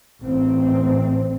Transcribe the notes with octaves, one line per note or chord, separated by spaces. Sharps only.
A1 C4